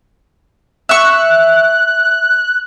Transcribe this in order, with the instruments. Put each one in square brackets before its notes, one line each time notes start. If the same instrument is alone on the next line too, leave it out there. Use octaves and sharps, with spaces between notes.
[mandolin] E5 C#6 [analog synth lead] F#6